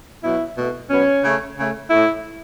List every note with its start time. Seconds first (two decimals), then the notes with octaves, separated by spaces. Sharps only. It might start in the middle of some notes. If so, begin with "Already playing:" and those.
0.23 B2 F#3 B3 E4
0.56 B2 A3
0.90 B2 F#3 B3 C#4
1.24 C#3 A3
1.57 C#3 A3
1.90 A2 A3 E4